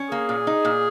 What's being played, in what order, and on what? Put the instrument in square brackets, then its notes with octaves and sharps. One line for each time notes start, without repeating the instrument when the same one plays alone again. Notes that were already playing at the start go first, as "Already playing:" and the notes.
Already playing: [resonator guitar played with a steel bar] C#4
[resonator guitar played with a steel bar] A#3 [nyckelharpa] G#4
[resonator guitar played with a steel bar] A#2
D#4
A#2